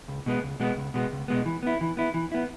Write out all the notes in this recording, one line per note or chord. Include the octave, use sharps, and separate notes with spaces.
C#2
B2 G#3 B3
C#2
B2 G#3 B3
C#2
B2 G#3 B3
C#2
B2 G#3 B3
E3
B3 E4
E3
B3 E4
E3
B3 E4